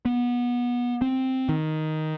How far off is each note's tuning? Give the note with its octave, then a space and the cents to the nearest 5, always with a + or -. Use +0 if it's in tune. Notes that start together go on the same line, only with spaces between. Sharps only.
B3 -25
C4 +0
D#3 +5